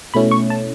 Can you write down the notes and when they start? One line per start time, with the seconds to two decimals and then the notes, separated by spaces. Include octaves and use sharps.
0.14 B2 A3 C#4 E4 B5
0.31 C#6
0.50 A5